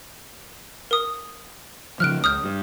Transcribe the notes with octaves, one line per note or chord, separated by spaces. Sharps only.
A#4 D#6
C#3 F3 F6 F#6 D7
C#2 D#6 F6 G6
G2